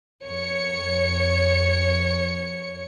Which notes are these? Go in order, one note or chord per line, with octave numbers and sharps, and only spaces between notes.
F2 C#5 C#7